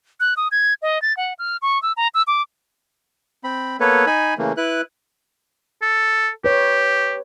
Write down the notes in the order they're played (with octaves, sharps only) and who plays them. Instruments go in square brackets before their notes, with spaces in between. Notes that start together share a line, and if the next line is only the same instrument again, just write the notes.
[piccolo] F#6
D#6
G#6
D#5
A6
F#5
F6
C#6
E6
A#5
E6
D6
[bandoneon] C4 B5
A#3 B3 A4 B4 C#5
D#4 G#5 B5
C#3 E3 A3 A#3
E4 B4 F#6
[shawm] A4
[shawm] G4 [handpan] B4 C#5